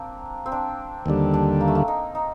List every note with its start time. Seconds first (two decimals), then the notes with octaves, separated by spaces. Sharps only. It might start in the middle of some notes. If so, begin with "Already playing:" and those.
Already playing: A#3 C4 D4
0.46 C4
0.52 D4
1.06 D#2 D3 G3
1.34 D4
1.61 A#3
1.68 A3
1.75 A#3
1.88 D#4
2.15 D#4